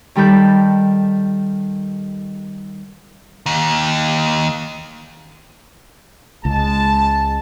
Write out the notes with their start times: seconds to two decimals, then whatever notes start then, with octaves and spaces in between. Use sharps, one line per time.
0.16 D#3 G3 A4 B5 G6
3.46 D#2
6.45 C#2 G#3 A5